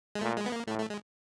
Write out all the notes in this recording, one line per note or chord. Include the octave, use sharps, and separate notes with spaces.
G#3
A#2 A3
G#3
B3
A#3
A2 A3
A3
G#3